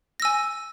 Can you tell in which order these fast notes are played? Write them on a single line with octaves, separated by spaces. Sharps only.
A#6 E6 G#5